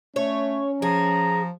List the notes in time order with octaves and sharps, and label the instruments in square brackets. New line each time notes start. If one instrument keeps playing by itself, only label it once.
[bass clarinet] A3 [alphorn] C#4 [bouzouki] C#5
[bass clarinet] F3 [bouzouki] G#4 [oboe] A#5